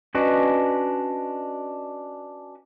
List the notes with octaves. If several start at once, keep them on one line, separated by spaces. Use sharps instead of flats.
C#4 D4 F#4 B4 D#5